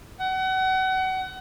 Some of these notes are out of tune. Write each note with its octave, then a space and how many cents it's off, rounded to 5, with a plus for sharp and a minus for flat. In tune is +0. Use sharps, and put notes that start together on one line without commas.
F#5 +30